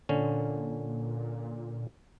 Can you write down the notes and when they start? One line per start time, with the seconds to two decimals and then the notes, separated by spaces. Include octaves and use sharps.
0.09 A#2 D3 C#4